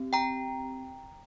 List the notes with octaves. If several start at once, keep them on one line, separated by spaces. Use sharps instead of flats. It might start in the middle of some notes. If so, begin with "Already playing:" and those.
Already playing: C4 G4
G5 A#5